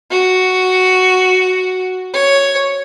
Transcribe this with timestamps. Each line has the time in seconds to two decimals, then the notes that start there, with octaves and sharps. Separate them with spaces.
0.11 F#4
2.14 C#5